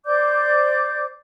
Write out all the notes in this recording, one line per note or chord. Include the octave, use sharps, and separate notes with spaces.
C5 D5 D6 G6